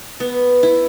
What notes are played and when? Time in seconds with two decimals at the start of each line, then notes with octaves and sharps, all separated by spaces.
0.20 B3
0.63 E4